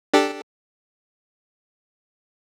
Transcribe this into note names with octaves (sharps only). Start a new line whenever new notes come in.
D4 G4 A4